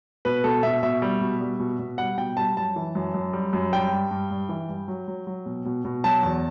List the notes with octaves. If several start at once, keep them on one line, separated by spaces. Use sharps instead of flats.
B2 B4
B2 A4
B2 E5
B2 E5
G3
B2
G3
B2
B2
G3 F#5
B2 G5
G3 A5
F#2 A5
E3
F#2
F#2
G3
F#2
G3 G5
G2
G2
G2
E3
G2
F#3
F#3
F#3
B2
B2
B2
F#3 A5
E2